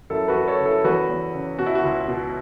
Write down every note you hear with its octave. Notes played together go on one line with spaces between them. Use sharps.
F#2 E4 A4
F#4 B4
F#2
A4 C#5
C#3
E4 A4
E2 F#4 B4
E2
C#3
B2 F#4
E4
F#4
C#2
B2